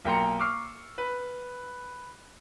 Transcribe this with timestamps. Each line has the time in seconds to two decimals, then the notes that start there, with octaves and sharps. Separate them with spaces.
0.05 B1 A#3 G5 A#5 C6 C#7
0.39 C#6 D6 E6 F6 C7
0.98 B4